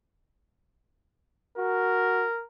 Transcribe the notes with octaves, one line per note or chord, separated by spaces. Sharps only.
F#4 A#4